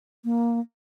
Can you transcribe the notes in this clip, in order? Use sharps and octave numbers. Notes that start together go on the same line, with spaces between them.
A#3